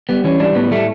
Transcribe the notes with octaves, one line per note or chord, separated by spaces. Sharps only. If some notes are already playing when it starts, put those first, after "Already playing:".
G3 B3
E3 C#4
G3 D4
A2 B3
G3 A3